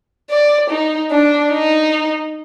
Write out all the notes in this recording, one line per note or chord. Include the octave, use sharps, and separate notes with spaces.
D5
D#4
D4
D#4